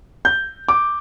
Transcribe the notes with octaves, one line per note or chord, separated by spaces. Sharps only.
G6
D6